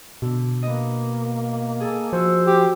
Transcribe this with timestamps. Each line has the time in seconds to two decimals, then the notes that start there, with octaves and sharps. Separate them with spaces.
0.22 B2 D3
0.63 A#3 B3 D#5
1.80 G#4 A4
2.13 F3 F#4 C5 E6
2.47 G4